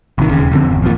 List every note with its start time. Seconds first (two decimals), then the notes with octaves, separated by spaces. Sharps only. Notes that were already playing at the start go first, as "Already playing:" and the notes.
0.18 A1 C3 D#3
0.31 E1 D#2 C#3
0.51 F2 D3 C4
0.69 G1 E2
0.82 A1 F2 A#2